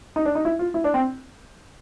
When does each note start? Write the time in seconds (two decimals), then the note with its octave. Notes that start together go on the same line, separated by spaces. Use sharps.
0.16 D#4
0.25 D4
0.35 D#4
0.45 E4
0.59 F4
0.74 E4
0.84 D4
0.94 C4